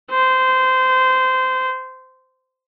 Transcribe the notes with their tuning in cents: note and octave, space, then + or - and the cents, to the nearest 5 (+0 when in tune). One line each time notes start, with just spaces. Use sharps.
C5 -20